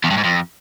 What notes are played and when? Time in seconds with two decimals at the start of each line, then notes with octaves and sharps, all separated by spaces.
0.04 E2
0.11 G2
0.18 G#2
0.25 F2